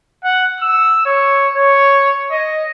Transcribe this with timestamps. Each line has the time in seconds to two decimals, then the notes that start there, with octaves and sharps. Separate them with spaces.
0.24 F#5
0.60 E6
1.06 C#5
1.55 C#5
2.31 D#5